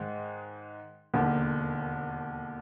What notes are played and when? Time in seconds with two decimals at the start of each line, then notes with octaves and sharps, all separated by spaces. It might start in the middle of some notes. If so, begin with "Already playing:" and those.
Already playing: G#2 D#3 G#3
1.14 E1 D#2 D3